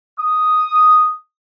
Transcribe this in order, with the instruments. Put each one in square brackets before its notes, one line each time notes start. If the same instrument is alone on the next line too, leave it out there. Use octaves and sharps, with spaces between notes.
[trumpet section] D#6